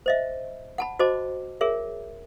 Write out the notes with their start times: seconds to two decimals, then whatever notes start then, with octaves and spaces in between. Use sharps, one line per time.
0.06 C5 D#5 E5
0.78 F#5 A5 B5
0.99 F#4 C5 D#5 A5 D6
1.61 G#4 A#4 C#5 E5